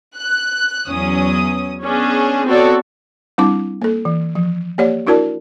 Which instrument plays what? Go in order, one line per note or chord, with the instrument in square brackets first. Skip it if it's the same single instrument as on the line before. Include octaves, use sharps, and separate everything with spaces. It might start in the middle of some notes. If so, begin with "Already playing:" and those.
[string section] F#6
E2 F#3 C#4 D#6
B3 C#4 D4 G#4
B3 C4 F#4 A4 C#5 D5
[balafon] G3 C4 D4 E4 A5 D6
A#3 A4
E3
F3
A#3 G4 C#5 D5 F#5
D4 E4 F#4 A#4 D5 A5